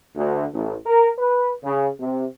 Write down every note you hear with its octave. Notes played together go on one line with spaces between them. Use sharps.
D2
A1
A#4
B4
C#3
C3